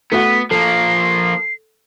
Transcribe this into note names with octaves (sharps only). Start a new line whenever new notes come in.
A3 B3 F#4 B6
F3 A#3 A4 C7